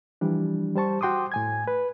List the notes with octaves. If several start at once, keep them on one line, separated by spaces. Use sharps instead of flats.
E3 F3 G3 D4
G3 C5 A5 C#6
F#4 G5 C6 D6 D#6
A2 G#5 G#6
B4